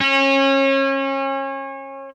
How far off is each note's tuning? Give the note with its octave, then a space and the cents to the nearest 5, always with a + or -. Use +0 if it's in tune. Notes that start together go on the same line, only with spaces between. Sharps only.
C#4 -30